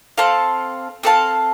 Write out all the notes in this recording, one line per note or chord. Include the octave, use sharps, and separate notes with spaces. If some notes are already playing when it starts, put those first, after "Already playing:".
C4 A4 F5 A5
C4 A4 F5 A5